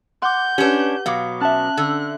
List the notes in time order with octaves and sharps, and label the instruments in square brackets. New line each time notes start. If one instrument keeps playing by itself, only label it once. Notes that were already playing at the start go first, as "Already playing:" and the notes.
[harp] F#5 [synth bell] C6 D6 [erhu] G6
[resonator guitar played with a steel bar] C#4 D4 [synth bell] G4 B4
[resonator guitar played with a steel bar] B2 F#3 [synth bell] F5 D6
[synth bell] C#4 E5 [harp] A5 F6 [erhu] F#6
[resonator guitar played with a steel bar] D3